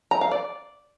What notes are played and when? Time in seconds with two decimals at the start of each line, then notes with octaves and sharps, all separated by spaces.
0.11 A#5
0.21 F5
0.31 D5